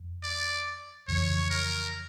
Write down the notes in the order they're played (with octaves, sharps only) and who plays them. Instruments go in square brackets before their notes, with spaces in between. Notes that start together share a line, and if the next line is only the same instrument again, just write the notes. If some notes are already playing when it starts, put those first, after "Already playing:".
Already playing: [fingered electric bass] F2
[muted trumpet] D5
[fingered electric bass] F2 C#3 E3 [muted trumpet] C#5
[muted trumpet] A#4